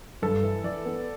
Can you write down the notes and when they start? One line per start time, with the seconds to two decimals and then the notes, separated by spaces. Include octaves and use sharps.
0.22 G2 A4
0.43 E3
0.64 E3 D5
0.85 B3